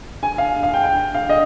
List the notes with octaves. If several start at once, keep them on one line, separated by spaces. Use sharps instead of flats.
G#5
F5
F5
G5
G5
F5
D#5